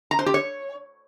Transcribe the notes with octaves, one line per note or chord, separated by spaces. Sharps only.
A#5
C5
G4
C#5